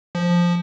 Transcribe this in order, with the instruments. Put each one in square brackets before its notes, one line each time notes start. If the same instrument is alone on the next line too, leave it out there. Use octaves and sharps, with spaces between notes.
[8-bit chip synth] F3